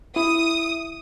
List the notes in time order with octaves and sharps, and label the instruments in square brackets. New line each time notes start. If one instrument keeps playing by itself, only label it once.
[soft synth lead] E4 [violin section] D#6